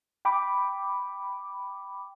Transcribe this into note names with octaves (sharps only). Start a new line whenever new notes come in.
G5 B5 D6